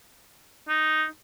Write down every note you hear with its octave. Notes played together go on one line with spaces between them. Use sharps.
D#4